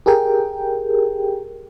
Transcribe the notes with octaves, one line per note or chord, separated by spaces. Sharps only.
G4 G#4 A#4 G5